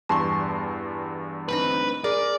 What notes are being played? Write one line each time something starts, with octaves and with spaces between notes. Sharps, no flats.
E2 G2 A5 C6 C#6
D2 C4 D#4 B4
G#4 A#4 D5